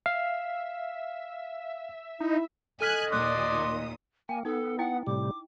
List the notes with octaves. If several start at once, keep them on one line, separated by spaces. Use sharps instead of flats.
E5 F5
D#4 E4
A4 D#5 G#5 F6 F#6 G#6 B6
D#2 A#2 D5 C6 D#6 F#6
A#3 G5 G#5
B3 D#4 A4 D#6
E4 D#5 F#5 G5
A2 C3 G3 D6